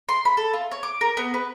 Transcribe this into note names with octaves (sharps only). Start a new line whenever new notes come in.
C6
B5
A4
F4
C#5
D6
A#4
B3
B4